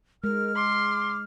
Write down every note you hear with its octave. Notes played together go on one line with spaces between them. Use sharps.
G#3 A#4 F6
C6 D6